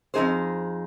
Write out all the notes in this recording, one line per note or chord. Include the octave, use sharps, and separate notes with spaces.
F2 C3 D#4 G#4 C5